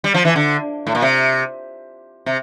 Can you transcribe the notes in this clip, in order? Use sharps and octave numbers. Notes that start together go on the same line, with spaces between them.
G3
F3
E3
D3
A2
A#2
C3
C3